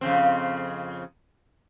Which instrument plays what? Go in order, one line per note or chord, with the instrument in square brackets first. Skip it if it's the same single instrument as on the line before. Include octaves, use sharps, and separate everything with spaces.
[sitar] F2 C#3 C4